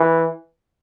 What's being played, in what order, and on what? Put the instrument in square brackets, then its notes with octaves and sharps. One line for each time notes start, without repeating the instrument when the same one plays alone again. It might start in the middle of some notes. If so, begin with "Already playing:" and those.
Already playing: [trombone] E3